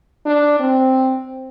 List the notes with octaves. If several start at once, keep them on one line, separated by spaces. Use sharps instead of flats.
D4
C4